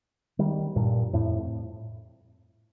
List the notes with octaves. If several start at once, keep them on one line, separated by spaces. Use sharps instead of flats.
D#3 G3
G2 A#2
F2 A2